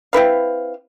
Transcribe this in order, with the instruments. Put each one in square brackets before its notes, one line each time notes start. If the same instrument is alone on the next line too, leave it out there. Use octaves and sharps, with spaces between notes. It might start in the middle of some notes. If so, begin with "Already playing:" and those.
[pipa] C4 E4 B4 F5